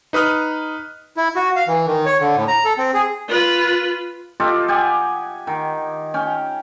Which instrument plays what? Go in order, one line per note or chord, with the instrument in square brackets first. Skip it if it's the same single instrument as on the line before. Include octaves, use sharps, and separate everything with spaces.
[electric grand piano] D#4 B4 D#6 F6 F#6
[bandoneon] E4
F#4
F5
E3
D#3
C#5
D3
A2
A#5
A4
C4
G#4
[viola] F4 B4
[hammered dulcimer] F4 G4 A4 D#5
G4 F#5 G#5
D#3
C#4 G5